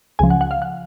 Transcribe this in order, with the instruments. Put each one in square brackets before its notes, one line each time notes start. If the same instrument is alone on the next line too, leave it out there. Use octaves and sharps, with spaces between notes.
[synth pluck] C#2 C#3 F3 G#5
F#5
F#5
F5
F#5